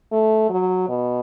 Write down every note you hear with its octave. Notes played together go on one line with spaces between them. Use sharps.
A3
F#3
B2